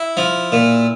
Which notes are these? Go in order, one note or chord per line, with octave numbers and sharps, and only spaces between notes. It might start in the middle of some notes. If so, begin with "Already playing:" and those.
Already playing: E4
F3
A#2